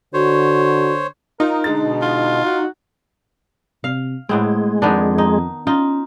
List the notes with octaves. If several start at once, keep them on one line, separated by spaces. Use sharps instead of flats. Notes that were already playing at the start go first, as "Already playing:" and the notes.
D3 F#4 C5 C#5
D#4 F4 A#4
D3 G#3 A6
B2
F4
F#4
C3 F5
A2 G#3 A3 B3 C4
F2 D#3 B3 D4
D#4
C#4 D#4 F4